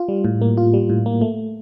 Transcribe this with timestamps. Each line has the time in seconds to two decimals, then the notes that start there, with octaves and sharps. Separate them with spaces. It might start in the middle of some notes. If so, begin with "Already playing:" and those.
Already playing: F4
0.08 G3
0.25 A2
0.41 A#3
0.57 F4
0.74 G3
0.89 A2
1.06 A#3
1.21 A3